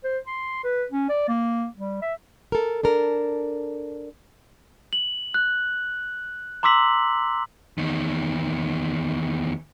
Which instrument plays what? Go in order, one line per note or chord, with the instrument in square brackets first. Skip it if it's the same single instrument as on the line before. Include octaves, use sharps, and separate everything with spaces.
[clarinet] C5
C6
B4
C#4
D5
A#3
G3
E5
[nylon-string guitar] A4 A#4
D4 A4 A#4
[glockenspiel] F#7
F#6
A#5 C6 D6 E6 B6 F#7
[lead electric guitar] E2 D#3